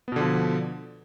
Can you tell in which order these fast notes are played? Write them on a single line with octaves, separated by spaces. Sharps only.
B3 B2 D3 F3